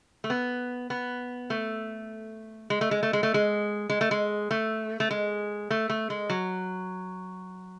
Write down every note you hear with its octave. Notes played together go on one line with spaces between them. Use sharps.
A3
B3
B3
A3
G#3
A3
G#3
A3
G#3
A3
G#3
G#3
A3
G#3
A3
A3
G#3
A3
A3
G#3
F#3